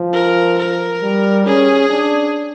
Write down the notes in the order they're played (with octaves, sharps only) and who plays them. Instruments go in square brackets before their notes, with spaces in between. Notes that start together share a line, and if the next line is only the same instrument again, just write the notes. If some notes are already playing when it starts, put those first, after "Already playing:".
Already playing: [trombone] F3
[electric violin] A#4
A#4
[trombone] G3
[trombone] C#4 [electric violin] G#4
[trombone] D4